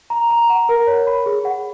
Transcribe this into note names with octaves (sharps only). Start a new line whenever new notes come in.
A#5
A#5
F#5
A#4
C#5
B5
G#4
F#5